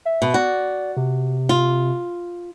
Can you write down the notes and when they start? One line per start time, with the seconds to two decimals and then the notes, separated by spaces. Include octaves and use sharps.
0.05 E5
0.22 B2
0.34 F#4 D5
0.97 C3
1.49 F4